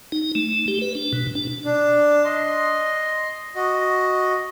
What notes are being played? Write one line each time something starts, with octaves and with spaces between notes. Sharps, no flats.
D#4
A3
G4
B4
D4
B2
D4
D4
D#5 C6
F#4 D#5